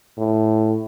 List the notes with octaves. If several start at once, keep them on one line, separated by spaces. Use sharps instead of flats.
A2